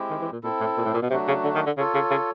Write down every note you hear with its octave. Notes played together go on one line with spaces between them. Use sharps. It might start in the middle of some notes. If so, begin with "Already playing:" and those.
Already playing: G#3 C4 E4 G4
D#3
E3
A#2
A#2 C4 E4 A4
A2
A#2
A2
A#2
B2
C3 F#3 A3 D4 F#4
C#3
D3
D#3
D3
C#3 F4 A4 C#5
C#3
C#3